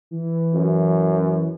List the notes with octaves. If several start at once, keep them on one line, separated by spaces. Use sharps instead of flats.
E3
F#2